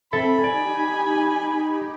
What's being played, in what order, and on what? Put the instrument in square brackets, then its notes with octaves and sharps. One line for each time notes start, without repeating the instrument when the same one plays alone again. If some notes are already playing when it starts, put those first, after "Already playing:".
[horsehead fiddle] C4 [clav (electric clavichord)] A4 E5 A5 [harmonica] B5
[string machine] D#4 G4 [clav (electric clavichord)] D5 [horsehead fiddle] G#5